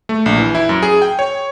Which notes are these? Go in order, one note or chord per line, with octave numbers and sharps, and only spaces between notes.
A3
A#1
E3
E4
F#2
G#4
G5
C#5